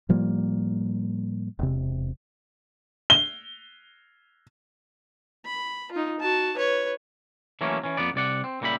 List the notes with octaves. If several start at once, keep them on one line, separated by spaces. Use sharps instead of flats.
A2 F3 G3 A#3
E1 C3
G7
B5
D#4 F4
F#4 A5
B4 C#5
E3 F#3 A3 A#3 C#4
E3 C#4
F2 A#3 B3 D5
C2 C3 D5 F#5
C4
C#2 A#2 G3 F#4 E5 B5